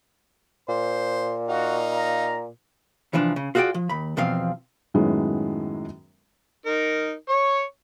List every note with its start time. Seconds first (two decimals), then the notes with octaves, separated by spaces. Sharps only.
0.69 A#2 C5
1.48 D#4 F#4 F5
1.92 A#5
3.13 C2 E3 F3 D4
3.36 C#3
3.55 F4 F#4 G#4 C5 D5 G5
3.74 F3
3.89 D#2 B5
4.17 E2 B2 F3 C4 F5
4.94 F#2 A2 D#3 G#3 B3 C#4
6.66 D#4 A#4
7.29 C#5 C#6